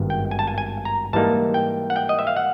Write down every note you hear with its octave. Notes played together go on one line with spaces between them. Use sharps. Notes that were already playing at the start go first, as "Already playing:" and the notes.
Already playing: G#1 G2 D#3 G#3 B3
G5
G#5
A5
G#5
G#5
A#5
G#2 E3 G3 A#3 D#4 A5
G5
F#5
G5
D#5
E5
F5
F#5